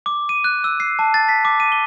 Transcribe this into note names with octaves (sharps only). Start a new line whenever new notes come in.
D6
D#7
F#6
E6
C7
A5
A6
B6
D6
D#7
G7